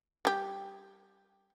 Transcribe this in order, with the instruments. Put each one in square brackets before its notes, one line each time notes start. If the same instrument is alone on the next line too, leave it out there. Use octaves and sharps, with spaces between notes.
[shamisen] G3 G4